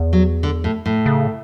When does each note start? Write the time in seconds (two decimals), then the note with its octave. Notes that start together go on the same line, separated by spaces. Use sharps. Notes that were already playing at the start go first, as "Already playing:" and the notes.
Already playing: E2
0.13 F#3
0.43 D3
0.64 A2
0.86 A2
1.06 C#3